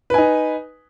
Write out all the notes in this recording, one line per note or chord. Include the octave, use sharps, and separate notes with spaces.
D#4 B4 G#5